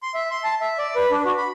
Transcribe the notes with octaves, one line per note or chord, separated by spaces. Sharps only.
C6
E5
C6
A5
E5
D5
B4
D4
F#4
B5